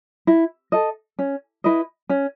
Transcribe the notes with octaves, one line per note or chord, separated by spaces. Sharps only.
E4
A4 D#5
C#4
E4 B4 D#5
C#4